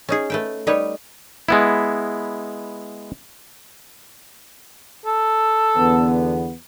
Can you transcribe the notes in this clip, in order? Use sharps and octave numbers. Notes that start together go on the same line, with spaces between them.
C#4 D#4 G#4
A3 B4 G5
G3 D#4 B4 C#5
G#3 B3 E4
A4
E2 D3 B3